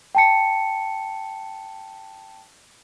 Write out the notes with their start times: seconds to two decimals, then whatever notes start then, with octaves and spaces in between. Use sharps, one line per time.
0.15 G5 A5 C#7